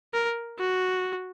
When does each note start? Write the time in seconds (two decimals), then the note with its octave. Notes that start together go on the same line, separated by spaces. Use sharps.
0.14 A#4
0.59 F#4